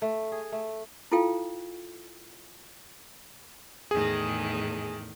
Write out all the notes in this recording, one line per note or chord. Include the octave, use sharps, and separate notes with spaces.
A3
G#4
A3
E4 F4 A4 F5 G5
E2 A2 D#3 G#4